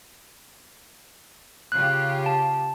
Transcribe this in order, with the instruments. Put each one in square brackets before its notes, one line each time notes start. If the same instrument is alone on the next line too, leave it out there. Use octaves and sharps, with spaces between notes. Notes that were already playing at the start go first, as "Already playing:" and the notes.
[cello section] C#3 F4 G4 [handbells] F#6
[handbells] A5